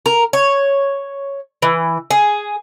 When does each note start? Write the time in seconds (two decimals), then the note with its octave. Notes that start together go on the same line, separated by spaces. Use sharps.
0.06 A#4
0.33 C#5
1.62 E3
2.10 G#4